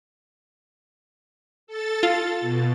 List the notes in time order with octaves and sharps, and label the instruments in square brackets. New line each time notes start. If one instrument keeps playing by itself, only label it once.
[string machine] A4 A6
[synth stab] F4
[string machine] B2